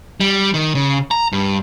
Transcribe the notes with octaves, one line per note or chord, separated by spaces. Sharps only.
G3
D#3
C#3
A#5
G2